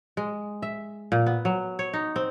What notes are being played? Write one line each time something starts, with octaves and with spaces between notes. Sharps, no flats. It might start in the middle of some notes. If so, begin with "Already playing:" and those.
G#3
E5
A#2
B3
F#3
C#5
D#4
C4